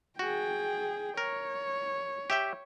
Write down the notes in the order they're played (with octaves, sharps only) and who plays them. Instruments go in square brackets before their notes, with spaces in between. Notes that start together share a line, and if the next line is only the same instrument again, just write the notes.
[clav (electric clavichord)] F#4 [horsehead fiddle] G#4 G5
[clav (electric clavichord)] A#4 [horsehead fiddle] C#5
[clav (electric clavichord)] G4 E5 G5